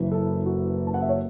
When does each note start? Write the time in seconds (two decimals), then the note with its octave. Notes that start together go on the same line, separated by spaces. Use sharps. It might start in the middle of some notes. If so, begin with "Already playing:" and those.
Already playing: F#1 F#2 E3 B4
0.12 A4
0.46 F#4
0.87 A5
0.94 F#5
1.02 E5
1.09 C#5